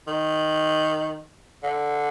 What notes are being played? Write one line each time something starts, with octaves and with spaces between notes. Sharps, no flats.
D#3
D3